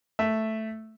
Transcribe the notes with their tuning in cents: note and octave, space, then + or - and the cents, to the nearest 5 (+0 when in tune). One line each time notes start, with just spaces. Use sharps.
A3 +0 E5 +0